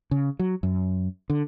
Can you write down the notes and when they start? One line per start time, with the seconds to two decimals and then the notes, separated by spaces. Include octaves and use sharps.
0.11 C#3
0.39 F#3
0.63 F#2
1.30 D3